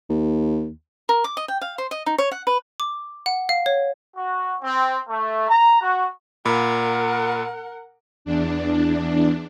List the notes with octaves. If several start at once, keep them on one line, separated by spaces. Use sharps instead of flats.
D#2
A#4
D6
D#5
G5
F5
C5
D#5
D#4
C#5
F#5
B4
D6
F#5
F5
C#5
F#4
C4
A3
A#5
F#4
A#2 A#4 F#5 B5
E2 D4